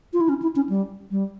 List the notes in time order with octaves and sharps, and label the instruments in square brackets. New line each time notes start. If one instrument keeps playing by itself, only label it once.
[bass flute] F4
E4
C#4
E4
C#4
G3
G3